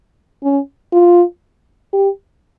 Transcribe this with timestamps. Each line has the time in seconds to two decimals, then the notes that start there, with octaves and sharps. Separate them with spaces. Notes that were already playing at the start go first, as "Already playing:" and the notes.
0.43 C#4
0.92 F4
1.93 G4